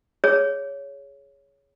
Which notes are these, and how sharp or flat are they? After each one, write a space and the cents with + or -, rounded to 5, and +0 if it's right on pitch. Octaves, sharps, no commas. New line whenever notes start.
G#4 +0 C#5 +10